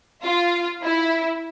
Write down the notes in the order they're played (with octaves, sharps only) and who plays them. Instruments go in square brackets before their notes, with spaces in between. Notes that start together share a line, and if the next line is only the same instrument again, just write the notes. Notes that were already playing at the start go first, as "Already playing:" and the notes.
[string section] F4
E4